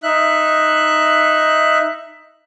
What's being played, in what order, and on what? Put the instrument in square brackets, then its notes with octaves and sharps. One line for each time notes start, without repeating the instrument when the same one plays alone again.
[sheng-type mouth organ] D#4 E5 F#6